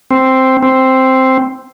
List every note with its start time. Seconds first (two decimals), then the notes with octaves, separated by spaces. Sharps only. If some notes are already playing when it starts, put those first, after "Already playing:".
0.11 C4
0.63 C4